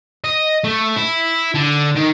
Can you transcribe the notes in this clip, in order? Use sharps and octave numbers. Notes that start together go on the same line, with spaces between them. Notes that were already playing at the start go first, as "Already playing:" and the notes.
D#5
A3
E4
D3
D#3